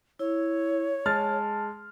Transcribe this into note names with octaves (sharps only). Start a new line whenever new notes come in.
E4 C#5
G#3 A5 F6 A6